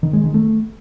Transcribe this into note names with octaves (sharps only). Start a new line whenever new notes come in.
D#3
G#3
D#3
A3